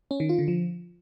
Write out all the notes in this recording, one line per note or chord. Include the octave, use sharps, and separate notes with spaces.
C#4
D#3
F4
D3
F3